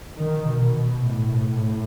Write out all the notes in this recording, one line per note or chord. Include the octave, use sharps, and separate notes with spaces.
D#3
B2
A2